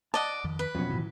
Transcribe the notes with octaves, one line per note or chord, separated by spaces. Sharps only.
D5 D#5 F#5 A5
F2 D#3
B4
F2 B2 F#3 C#4
A2 D#3 E3